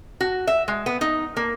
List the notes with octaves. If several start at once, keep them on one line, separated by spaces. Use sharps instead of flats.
F#4
E5
G#3
B3
D#4
A#3